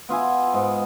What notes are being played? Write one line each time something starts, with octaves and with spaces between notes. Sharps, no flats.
B3 F4 E5 G#5
G#2